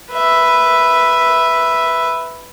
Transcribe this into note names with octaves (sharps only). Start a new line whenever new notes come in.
B4 E5